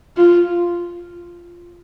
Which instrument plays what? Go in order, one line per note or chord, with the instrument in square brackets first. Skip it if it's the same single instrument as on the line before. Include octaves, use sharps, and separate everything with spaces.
[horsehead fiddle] F4